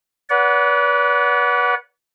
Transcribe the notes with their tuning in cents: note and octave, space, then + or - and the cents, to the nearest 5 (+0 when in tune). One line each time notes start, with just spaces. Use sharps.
B4 -25 D5 -40 F#5 +0